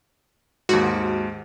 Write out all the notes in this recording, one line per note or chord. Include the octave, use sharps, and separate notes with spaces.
D#2 G#2 F#4